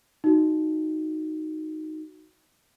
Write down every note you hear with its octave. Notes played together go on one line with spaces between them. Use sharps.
D#4 F#4